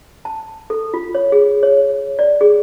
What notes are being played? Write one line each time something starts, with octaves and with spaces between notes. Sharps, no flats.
A5
A4
F4
C#5
G#4
C#5
D5
G#4